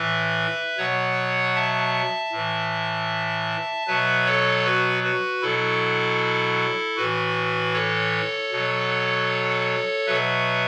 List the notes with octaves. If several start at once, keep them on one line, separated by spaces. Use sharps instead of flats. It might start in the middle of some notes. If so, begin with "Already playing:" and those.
Already playing: A2 E3 B4 E5
B2 F#3 C#5 F#5
E5 A5
A2 E3
B2 F#3 B4 E5
A4 C#5
F#4 B4
F#4 B4
B2 F#3 E4 A4
A2 E3 F#4 B4
A4 C#5
B2 F#3
B2 F#3 B4 E5